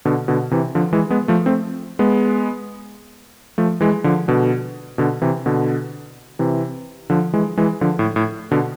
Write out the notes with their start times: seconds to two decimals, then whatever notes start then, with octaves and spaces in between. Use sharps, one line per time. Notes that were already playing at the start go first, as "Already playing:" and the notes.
0.05 B2 D3
0.28 B2 D3
0.51 C3 E3
0.75 D3 F3
0.93 E3 G#3
1.10 G#3 B3
1.28 F3 A3
1.46 A3 C4
1.99 G#3 B3
3.58 F3 A3
3.81 E3 G#3
4.04 D3 F3
4.28 B2 D3
4.98 B2 D3
5.22 C3 E3
5.46 B2 D3
6.39 C3 E3
7.10 D3 F3
7.33 E3 G#3
7.57 E3 G#3
7.81 D3 F3
7.99 A2
8.16 A2
8.51 B2 D3